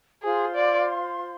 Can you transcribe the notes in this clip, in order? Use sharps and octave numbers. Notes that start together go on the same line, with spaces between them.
F4 G#4 C5 F5 C6
D5